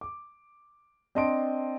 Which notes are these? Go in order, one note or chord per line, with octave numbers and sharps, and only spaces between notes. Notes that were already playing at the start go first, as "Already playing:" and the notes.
D6
C4 D4 D#5 A5 C6 D7